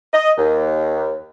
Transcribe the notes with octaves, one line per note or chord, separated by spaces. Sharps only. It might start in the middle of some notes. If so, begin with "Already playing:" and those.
D#5
D#2